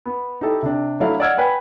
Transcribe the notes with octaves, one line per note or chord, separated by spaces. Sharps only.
B3
D#4 E4 G4 A4
C3 D4
F#3 A3 D4 E4 A4 F5
D5 D#5 F#5 E6 F6 G#6
B4 G5 G#5